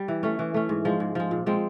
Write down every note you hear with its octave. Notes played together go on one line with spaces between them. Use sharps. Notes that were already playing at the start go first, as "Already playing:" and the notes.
Already playing: G3
E3
A3 C#4
E3
A3 C#4
G#2
F3 G#3
G#2
F3 G#3
A#2
F3 G#3 C4